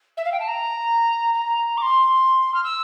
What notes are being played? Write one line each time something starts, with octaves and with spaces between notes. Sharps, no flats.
E5
F5
G5
A5
A#5
A#5
D6
C6
F6
E6